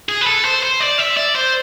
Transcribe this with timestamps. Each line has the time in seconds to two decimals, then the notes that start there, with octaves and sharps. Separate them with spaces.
0.09 G#4
0.21 B4
0.27 A4
0.45 C5
0.63 C5
0.81 D5
0.99 E5
1.17 D5
1.35 C5